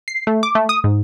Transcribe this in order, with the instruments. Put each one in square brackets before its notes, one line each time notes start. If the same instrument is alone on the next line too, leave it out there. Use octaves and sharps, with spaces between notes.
[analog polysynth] C7
A3
D6
A3
D#6
G#2